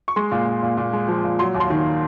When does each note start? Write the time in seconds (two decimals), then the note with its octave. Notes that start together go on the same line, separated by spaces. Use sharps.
0.08 C#6
0.16 G#3 C6
0.32 A#2
0.47 A#2
0.63 A#2
0.77 A#2
0.93 G#3
1.08 F3
1.24 A#2
1.39 F#3 C6
1.54 D#2
1.60 C6
1.70 D#3